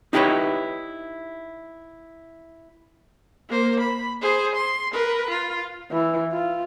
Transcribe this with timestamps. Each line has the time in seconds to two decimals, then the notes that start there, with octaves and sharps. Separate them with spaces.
0.13 D#4 E4 G4 A4 B4 C#5
3.49 A#3 C5
3.80 B5
4.21 G#4 C5
4.56 C6
4.93 A#4 B4
5.31 F4
5.91 E3
6.32 F4